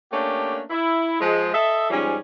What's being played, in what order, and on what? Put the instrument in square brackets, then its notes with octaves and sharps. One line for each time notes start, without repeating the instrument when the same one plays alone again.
[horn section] A3 A#3 C#4 D4 G4
E4
F3 G#3
A4 D#5 E5
G#2 F3 G3 C#4